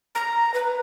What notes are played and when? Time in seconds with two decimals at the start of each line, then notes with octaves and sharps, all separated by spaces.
0.15 A#5
0.54 B4